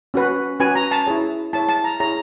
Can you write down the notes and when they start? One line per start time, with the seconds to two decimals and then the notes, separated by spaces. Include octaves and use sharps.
0.14 C#4 F#4 B4
0.60 C#4 F#4 B4 G#5
0.75 A#5
0.91 A5
1.07 E4 G#4 C#5
1.53 E4 G#4 C#5 A5
1.69 A5
1.84 A#5
2.00 E4 G#4 C#5 A#5